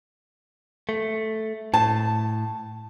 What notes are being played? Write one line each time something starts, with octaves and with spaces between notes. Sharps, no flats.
A3
A2 A5